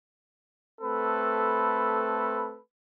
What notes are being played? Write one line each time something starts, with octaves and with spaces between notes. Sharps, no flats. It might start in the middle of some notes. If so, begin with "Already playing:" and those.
A3 C4 A4 B4 B5